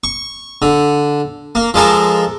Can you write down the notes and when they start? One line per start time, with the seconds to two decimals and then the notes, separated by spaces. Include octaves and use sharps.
0.04 C#6
0.62 D3
1.55 A#3
1.74 F3 G#3 A4 A#4